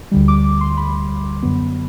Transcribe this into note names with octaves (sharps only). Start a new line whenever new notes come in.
D2 D3 G3
D6
D6
C6
B5
F#2 D3 F#3 B3